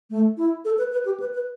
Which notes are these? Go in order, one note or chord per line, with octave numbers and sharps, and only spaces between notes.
A3
E4
A4
B4
B4
G4
B4
B4